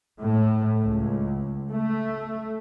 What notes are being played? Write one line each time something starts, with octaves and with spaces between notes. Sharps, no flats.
A2
C#2
A3